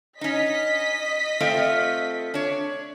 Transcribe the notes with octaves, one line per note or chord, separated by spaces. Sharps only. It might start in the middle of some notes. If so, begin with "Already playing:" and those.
C#4 D#4 D#5 B6
A3 C4 F4
D4 C#5